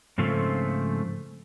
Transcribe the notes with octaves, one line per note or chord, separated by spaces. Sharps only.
G#2 C#3 F3 A3 C4